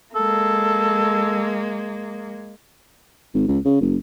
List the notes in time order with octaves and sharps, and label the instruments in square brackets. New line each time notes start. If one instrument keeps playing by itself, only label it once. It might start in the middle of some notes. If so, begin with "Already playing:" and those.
[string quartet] G#3 A#3 [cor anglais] A4
[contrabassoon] G#1
C#2
C#3
F#1